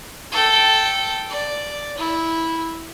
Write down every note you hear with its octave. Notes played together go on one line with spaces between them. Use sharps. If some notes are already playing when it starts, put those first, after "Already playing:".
A4 G5
D5
E4